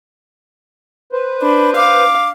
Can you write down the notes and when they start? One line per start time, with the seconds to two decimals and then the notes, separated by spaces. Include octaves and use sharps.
1.12 B4 C5
1.42 D4 B5
1.76 F5 D6